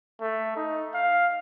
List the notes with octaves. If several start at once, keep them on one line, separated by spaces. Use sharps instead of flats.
A3
D#4
F5